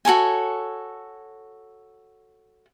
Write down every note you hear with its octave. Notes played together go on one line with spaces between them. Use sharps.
F#4 A4 C#5 G#5